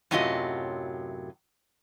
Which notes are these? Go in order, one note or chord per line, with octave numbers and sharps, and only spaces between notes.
F#2 A2 C3 F#3 F4 D#5